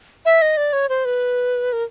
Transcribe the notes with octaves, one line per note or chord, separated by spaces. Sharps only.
E5
D#5
D5
C#5
C5
B4
A#4